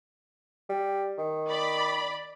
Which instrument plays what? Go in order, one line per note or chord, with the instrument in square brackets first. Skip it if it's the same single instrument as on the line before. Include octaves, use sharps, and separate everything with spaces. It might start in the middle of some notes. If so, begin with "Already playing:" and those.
[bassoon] G3
D#3
[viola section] D5 B5